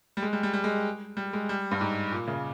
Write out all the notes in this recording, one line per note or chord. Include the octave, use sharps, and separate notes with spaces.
G3
G#3
G3
G3
G3
G#3
G3
G#3
G3
G2
G#2
A#2
C#3